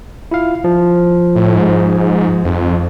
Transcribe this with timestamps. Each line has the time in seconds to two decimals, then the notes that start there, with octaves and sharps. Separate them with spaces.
0.31 E4 F4 F5
0.64 F3
1.36 A2
1.56 G#2
2.45 F2